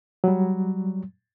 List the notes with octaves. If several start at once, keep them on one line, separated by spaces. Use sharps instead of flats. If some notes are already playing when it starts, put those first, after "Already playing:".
F#3 G3